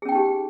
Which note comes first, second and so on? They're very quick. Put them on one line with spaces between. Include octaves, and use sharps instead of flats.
G#4 C#4 G5 D#4 G4